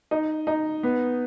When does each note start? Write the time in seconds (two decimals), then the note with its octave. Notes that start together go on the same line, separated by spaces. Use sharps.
0.11 D#4
0.47 D#4
0.83 B3